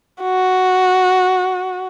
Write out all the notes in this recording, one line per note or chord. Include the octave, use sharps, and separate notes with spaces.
F#4